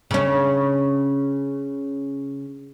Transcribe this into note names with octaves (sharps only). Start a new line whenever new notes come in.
C#3 C#4